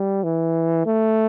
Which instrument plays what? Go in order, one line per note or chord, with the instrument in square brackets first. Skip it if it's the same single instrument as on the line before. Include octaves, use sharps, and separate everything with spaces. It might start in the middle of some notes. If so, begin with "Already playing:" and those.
Already playing: [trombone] G3
E3
A3